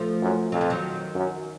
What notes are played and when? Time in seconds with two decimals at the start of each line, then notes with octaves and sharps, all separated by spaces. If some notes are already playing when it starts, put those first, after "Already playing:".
Already playing: F3 A3
0.22 F#2
0.52 F2 F#3
0.61 F3
0.70 D#3 F#3
1.15 F#2